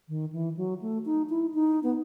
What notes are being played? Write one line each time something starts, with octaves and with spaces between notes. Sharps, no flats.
D#3
E3
F#3
A3
D#4
E4
D#4
B3